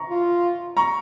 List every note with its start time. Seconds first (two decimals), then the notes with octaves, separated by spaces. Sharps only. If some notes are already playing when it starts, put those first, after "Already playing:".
Already playing: A#5 C#6
0.10 F4
0.77 A#5 C#6